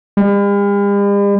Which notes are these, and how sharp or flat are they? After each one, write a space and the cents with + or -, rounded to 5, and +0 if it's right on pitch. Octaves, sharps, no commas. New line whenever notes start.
G3 +45